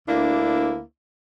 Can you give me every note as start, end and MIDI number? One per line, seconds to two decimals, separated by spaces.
0.09 0.81 38
0.09 0.81 58
0.09 0.81 62
0.09 0.81 64